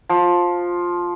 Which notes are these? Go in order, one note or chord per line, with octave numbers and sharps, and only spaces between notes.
F3